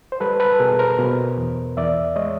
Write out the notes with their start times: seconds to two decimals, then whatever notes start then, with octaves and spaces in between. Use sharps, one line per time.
0.12 C5
0.20 G3 A4 B4
0.40 A4 B4
0.59 B2 G#4 A#4
0.79 A#4 C5
0.98 B2
1.38 E2
1.77 E2 D5 E5
2.16 G#3 C#5 D#5